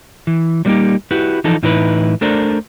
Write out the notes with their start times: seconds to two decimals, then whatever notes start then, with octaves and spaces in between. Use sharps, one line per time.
0.27 E3
0.65 F#3 G3 A3 A#3 D#4 G4
1.11 E4 F#4 G4 B4
1.44 E3 F3 D#4 A4
1.63 A2 E3 D#4 E4 A4 B4
2.21 A3 D4 A4 A#4 C5 D5